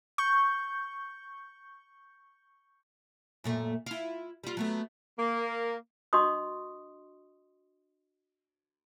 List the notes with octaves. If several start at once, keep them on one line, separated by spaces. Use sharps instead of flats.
C#6 G6
F#2 A#2 A3
E4 F4
G3 F4
F#3 A3 B3
A#3
D4 F#4 D#5 C6 C#6 D#6